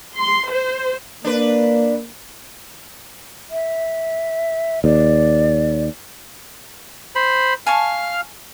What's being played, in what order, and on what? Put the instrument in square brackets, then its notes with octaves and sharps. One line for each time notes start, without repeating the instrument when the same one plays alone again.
[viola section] C6
C5
[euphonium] A#3 [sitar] D4 B4
[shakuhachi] E5
[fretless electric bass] D#2 [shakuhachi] D5
[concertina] C5 B5
[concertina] F5 F6 [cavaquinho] G#5 A5 C#6